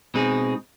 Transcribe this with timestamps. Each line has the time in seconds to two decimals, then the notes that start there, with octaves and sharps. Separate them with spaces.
0.14 B2 G#3 C4 D#4 G#4